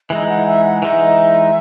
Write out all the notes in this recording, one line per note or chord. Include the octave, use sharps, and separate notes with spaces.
E3 G#3 D#4 E5
F#5
E5
F#5
E3 G#3 D#4 E5